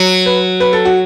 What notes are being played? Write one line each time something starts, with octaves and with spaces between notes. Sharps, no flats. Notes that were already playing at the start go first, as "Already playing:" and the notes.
Already playing: F#3
B4
B4
A4
F#4